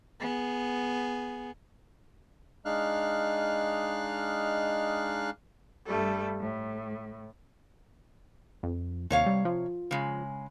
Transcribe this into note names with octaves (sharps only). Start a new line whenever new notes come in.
B3 G#4
G#3 D4 D#4 F5 F6 F#6
G2 G3 A3 A4
A2
F2
D#2 C3 C#5 F5
G3
F3
C#3 G#3